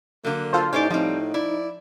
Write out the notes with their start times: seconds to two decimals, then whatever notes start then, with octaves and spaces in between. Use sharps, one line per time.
0.24 D3 F#3 A#3
0.53 F4 A4 C5
0.73 A2 C#4 D#4 G4 C5 D5
0.90 F3 G3 C4 D#4
1.34 E4 D5